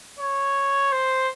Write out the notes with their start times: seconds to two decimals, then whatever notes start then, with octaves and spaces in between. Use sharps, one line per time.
0.19 C#5
0.92 C5